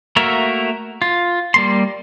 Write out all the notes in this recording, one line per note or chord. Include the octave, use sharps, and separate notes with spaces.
A3 A#3 F#4 A#4 E5
F4
G3 A#3 C6